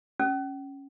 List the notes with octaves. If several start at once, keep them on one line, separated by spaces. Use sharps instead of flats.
C#4